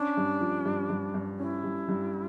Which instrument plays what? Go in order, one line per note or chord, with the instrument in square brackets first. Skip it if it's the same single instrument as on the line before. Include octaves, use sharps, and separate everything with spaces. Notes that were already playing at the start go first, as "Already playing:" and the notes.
Already playing: [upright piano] C#4 [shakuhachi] D4
[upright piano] G2
F3
G2
G2
G2
[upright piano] C#4 [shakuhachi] E4
[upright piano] G2
G2